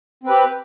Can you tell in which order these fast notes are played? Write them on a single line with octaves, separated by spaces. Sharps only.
C4 B4 G4